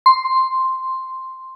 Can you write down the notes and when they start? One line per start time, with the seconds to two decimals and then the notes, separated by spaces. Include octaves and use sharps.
0.06 C6